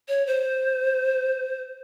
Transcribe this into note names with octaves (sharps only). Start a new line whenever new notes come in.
C#5
C5